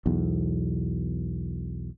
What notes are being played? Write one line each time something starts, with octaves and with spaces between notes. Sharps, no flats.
B1 E2